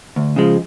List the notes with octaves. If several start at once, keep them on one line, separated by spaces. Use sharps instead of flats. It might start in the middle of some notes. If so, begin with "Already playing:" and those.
D2
C#3 F3 G#3